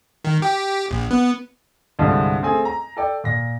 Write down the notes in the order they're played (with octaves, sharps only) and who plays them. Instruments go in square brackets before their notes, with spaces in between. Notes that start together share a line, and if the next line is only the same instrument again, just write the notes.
[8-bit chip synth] D#3
G4
A#1
B3
[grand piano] C2 G2 D3 F3 G3 G#3
A3 C4 G#4 G#5
A#5
A4 D5 G5
A#2 A#6